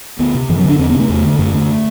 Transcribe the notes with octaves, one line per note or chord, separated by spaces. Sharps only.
D2 B3
C3
F#2 E3
F#3
D3 D4
E2 C4
B3
C3 A3
E2
D3
F#2 A3
D3